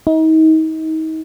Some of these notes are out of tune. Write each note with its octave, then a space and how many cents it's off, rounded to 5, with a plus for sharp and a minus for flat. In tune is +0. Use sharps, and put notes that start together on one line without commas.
D#4 +35